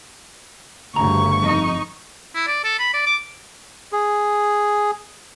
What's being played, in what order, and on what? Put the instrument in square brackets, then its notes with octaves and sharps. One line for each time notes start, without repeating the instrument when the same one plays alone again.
[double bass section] G1 G2 C#3 [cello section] D2 [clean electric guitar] A#5 [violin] C#6
[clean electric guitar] F2 [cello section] D#4
[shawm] E4
D5
A4
B5
D5
D6
[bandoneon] G#4